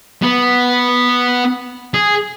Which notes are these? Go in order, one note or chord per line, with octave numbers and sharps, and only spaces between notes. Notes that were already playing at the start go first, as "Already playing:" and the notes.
B3
G#4